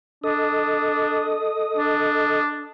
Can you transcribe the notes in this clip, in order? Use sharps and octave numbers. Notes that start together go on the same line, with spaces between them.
D4 A4 D#5 D#6
D4